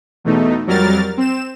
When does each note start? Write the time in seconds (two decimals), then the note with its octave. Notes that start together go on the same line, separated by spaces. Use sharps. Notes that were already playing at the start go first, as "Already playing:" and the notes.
0.24 E2 B2 A3 D#4
0.67 F2 F#3 G3 A#4 F6 A6
1.17 C4 E7